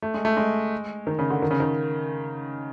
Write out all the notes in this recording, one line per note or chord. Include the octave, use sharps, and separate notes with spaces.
A3
G#3
A3
G#3
D#3
C#3
D3
D#3
C#3
D#3